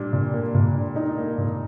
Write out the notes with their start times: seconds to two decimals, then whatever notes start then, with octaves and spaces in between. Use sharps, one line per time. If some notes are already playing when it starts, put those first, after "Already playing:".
Already playing: A#2 G3 D4
0.13 A#2
0.34 A#3
0.55 A#2
0.75 D4
0.96 D4 D#4
1.18 A#3
1.38 A#2